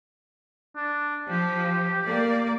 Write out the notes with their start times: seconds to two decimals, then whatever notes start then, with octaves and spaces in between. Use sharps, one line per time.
0.76 D4
1.29 F3 G4
2.03 A#3 D5